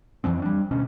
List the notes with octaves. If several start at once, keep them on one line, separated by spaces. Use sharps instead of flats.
F2 E3 F3 C4
G3 D4
D2 B2 C#4